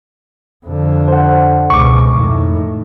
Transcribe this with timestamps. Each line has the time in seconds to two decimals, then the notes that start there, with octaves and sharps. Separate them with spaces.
0.66 F2 D3
1.08 C5 F#5
1.70 C#2 B2 C#6 D6
2.16 F2 A2 D#3